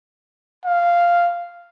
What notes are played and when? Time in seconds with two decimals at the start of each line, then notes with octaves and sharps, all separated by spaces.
0.65 F5